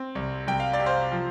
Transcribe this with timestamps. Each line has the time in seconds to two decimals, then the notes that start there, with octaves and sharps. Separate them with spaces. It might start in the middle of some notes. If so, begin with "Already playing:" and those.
Already playing: C4
0.15 C2
0.47 C2 G5
0.60 F5
0.73 D5
0.79 C3
0.86 C5 F5
1.12 F3